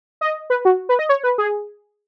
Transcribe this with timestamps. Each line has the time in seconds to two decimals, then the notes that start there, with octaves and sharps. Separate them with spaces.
0.21 D#5
0.50 B4
0.65 F#4
0.89 B4
0.99 D#5
1.09 C#5
1.24 B4
1.38 G#4